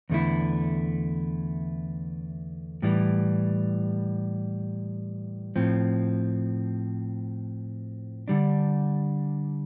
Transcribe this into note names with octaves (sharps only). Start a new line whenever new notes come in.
E2 D3 A3 E4
A2 E3 G3
A2 F3 C4
D3 G3 D4